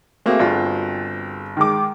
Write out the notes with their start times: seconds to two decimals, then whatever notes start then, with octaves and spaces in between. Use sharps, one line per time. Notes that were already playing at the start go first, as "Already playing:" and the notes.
0.26 A3 A#3 C4 F#4 G#4
0.39 G1 F4
1.57 D#3 G#3 D6